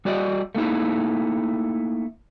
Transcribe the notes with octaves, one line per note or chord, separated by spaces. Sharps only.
G3 F#4 D5 D#5
A3 A#3 D#4 E4